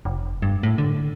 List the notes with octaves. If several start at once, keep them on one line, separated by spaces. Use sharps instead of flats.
F1
G2
A2
D3